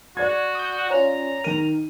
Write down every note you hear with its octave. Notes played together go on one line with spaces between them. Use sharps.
F#4 D5 G#6
D#6 G6
C#4 F4 A#5
D#3 A#4 D#7